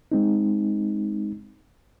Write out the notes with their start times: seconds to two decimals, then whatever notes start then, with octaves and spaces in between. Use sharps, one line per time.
0.12 G#3 C4 D#4